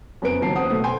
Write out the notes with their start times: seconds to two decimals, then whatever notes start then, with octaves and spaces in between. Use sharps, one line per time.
0.22 F#2 B3 C4 B4 D7
0.42 F#1 D#2 F#3 A5 C7
0.55 C5 F#5 D#6
0.70 B2 A3
0.84 G5 G#5 C6